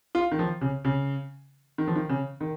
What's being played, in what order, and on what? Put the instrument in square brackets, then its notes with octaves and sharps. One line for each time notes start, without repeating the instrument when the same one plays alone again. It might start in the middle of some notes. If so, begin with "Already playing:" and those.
[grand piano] F4
D#3
F3
C#3
C#3
D#3
F3
D#3
C#3
D#3